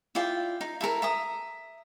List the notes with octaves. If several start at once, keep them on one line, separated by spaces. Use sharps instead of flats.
E4 F4 D5 G5
D#4
E4 A4 A#4
E5 A#5 D#6